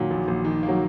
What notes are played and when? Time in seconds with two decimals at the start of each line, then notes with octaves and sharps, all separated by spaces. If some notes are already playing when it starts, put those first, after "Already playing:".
Already playing: A#2 D#3 F#3
0.11 A#1
0.28 A#1
0.45 D#3
0.63 A#3
0.68 F#3